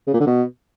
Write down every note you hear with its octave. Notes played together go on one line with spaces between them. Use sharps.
C#3
A#2
D3
B2